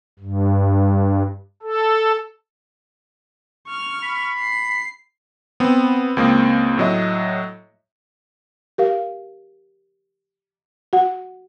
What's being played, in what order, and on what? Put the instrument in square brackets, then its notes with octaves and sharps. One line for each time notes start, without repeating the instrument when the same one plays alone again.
[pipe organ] G2
A4
[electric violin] C#6 F6
[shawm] B5
[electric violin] C7
[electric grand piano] B3 C4
C#2 A#3 C4 D#6
A2 F#3 D#5 E5
[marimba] G4 A#4 F5
F#4 F#5